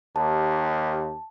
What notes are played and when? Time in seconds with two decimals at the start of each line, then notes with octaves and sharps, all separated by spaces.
0.16 D#2 D#3 G4 A5